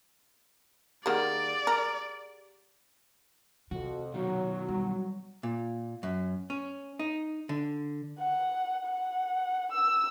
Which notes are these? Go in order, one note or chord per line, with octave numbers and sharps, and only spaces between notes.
D#3 A#3 G4 G#4 D5 F#5
A#4
F2 C3 F#4
B2 D#3 F#3
G3
A#2
F#2
C#4
D#4
D3
F#5
F#5
E6